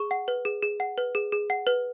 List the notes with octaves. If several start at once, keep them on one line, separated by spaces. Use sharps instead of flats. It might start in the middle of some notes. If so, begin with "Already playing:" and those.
Already playing: G#4 C#6
F#5
B4
G#4
G#4
F#5
B4
G#4
G#4
F#5
B4